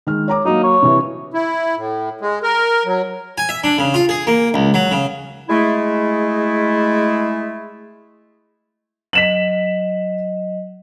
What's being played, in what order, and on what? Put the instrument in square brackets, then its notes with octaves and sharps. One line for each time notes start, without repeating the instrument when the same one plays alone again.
[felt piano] D#3 G#3 F6
C#5 A#5 D6
[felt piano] F#3 A#3 [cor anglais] D#4
[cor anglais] C#5
[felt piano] C3 E3
[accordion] E4
A2
G#3
A#4
F#3
[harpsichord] G#5
E5
D4
C#3
F4
G#4
A#3
C#2
F#3
C#3
[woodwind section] G#3 A3 E4
[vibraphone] F#3 D#5 [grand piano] B6 E7 F#7